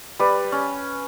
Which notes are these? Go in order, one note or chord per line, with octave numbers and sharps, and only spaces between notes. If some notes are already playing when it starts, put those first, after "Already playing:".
G3 B4 D5
C#4